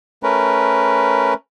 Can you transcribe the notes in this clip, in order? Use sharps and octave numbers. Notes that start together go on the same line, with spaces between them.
A3 C#4 A#4 B4